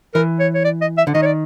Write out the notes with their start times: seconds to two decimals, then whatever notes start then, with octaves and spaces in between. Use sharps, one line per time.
0.14 E3 A#4
0.39 C#5
0.54 C#5
0.64 D5
0.81 D#5
0.98 E5
1.07 D3
1.14 D#3 D#5
1.22 C#5
1.26 D5